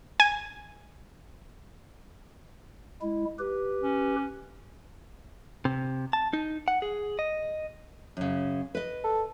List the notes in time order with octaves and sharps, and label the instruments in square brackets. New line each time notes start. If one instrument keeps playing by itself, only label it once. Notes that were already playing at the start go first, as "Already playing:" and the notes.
[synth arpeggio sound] G#5
[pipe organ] G#3 E4
G4 B4
[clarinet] C#4
[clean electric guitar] C3
A5
D#4
F#5
G#4
D#5
[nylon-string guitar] F#2 C#3
B4 D#5
[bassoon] A4